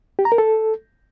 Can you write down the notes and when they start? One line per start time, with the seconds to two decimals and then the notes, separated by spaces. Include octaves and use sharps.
0.19 G4
0.25 A#5
0.32 A#4
0.38 A4